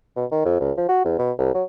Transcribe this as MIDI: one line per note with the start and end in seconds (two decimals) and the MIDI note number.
0.16 0.25 47
0.31 0.44 51
0.45 0.60 41
0.61 0.72 37
0.77 0.86 53
0.89 1.02 66
1.05 1.16 40
1.19 1.32 47
1.39 1.51 36
1.54 1.63 54